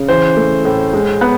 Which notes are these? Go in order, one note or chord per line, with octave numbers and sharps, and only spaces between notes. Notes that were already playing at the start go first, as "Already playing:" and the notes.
Already playing: C#3
E3 C5
A3
A2
G#3
B3